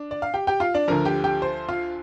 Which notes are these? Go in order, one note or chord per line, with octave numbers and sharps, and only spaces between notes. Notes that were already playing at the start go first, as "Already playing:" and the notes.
Already playing: D4
D5
F5
G4 G5
G4 G5
F4 F5
D4 D5
D2 D3 F3 A#4 A#5
G4 G5
G4 G5
C5
F4 F5